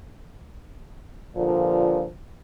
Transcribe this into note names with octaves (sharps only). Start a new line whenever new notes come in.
G2 A#2 D3 F3